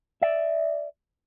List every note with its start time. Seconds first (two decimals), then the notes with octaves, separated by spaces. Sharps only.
0.22 D5 E5